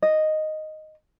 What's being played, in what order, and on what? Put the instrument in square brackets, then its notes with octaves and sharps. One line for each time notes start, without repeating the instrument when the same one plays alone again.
[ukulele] D#5